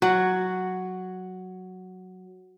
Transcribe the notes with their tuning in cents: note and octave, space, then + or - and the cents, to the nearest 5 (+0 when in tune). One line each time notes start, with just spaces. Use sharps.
F#3 +0 F#4 +0